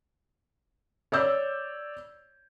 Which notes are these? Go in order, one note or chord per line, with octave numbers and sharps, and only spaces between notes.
C#5 D5 E6 G6